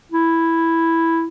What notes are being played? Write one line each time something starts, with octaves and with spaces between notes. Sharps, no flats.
E4